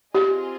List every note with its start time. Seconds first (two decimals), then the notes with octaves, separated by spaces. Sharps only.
0.14 C4 F4 G4 G#4 D#5